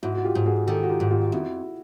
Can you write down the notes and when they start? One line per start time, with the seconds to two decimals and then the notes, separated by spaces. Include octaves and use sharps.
0.03 G#2 E4 F#4
0.15 F#4
0.25 F4 G4
0.35 G#2
0.46 F#4 G#4
0.67 D#3 G4 A4
0.83 F#4
0.89 F4 G4
1.00 G#2
1.11 F4 G4
1.32 F2 E4 F#4